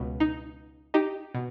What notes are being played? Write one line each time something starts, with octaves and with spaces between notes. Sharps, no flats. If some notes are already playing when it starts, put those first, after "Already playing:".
Already playing: C#2 B2
D#4
D#4 G4
B2